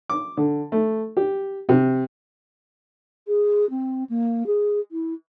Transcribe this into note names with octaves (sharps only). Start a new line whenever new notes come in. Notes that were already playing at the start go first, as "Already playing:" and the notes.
D6
D3
A3
G4
C3
G#4
C4
A#3
G#4
E4